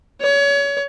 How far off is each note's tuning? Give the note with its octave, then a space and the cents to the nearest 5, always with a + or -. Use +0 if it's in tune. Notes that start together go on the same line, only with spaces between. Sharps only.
C#5 +30